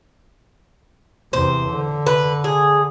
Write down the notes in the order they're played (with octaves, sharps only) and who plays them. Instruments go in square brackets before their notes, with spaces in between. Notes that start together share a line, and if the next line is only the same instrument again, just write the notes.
[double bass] E2 C3 [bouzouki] C5
[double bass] D3
[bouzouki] B4
G#4